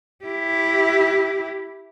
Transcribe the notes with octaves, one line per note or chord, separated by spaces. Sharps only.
E4 G4